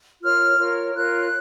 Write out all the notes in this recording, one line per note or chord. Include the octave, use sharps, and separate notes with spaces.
F4 A#4 C#5 F6
F4 A#4 C#5
F4 A#4 C#5 F#6